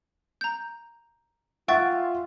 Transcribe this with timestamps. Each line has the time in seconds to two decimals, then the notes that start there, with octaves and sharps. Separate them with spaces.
0.41 A#5 G6
1.68 F4 E5 F#5 G5 C#6 A6